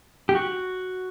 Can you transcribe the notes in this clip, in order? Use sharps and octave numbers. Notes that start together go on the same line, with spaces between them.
G4
F#4